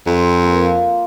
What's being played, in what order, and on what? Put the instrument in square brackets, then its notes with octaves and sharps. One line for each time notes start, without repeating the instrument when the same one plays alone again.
[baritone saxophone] F2 [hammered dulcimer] C6
[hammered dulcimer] A#3 F4